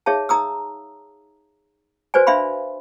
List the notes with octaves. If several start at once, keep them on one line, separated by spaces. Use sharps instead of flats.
D#4 G#4 C#5 E5 F5 A5
D#4 A#5 D#6 E6
F#4 B4 C5 D5 G#5
D4 E5 F5 B5 C6